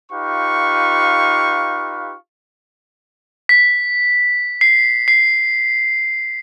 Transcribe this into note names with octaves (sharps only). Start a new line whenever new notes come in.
D#4 F4 G4 B4 F5 C#6
B6
C7
C7